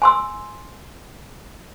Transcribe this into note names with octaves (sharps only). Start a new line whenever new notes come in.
G#5 C6 E6